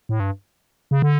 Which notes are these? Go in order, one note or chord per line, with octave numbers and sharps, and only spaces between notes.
A2
G2
C#3
D3